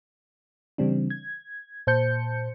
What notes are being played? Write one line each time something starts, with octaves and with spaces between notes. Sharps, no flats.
C#3 E3 G3 C4 D4
G#6
A#2 C5 A5 G6 C#7